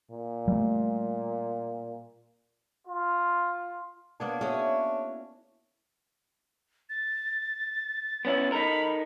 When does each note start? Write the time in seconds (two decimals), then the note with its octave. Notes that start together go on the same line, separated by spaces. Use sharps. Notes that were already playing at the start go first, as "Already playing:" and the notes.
0.11 A#2
0.48 G3 A3
2.87 F4
4.20 A#3 B3 D4 C#5
4.41 C#4 E4 F#4 G#4 C#5 D#5
6.90 A6
8.25 B3 C#4 E4
8.52 D#4 A4 A#4 B5